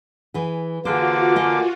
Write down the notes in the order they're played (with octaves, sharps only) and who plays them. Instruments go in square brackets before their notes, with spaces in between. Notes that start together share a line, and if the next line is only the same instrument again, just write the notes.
[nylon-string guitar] E3 G#4
[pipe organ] D3 A#3 D6 [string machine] F4 F#4 [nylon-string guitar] G#4 B4 C5
[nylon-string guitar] A#4 D#5 G#5